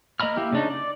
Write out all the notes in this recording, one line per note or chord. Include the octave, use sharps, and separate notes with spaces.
A#3 D#5 A#5 B5 F6
A#3 E4 G4
C#3 D4 D#4
D5